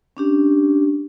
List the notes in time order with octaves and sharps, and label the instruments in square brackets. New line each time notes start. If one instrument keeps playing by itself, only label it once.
[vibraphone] C#4 D4 G4